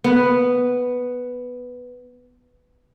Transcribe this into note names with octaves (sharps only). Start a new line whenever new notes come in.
B3 B4